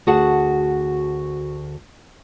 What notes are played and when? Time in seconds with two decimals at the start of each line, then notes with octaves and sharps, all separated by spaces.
0.07 D2 F#4 G#4 F#5 A5